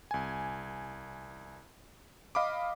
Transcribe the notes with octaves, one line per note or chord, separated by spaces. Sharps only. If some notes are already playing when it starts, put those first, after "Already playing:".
C2 G#5
D#5 F5 B5 D6